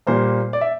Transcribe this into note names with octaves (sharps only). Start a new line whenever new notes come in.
A#2 G3 A#3 C5
D5
E5